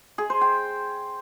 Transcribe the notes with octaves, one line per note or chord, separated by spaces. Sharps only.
G#4
C5
G5